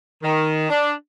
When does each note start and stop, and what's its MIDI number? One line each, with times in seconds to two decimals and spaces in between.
0.22 0.65 51
0.69 0.92 62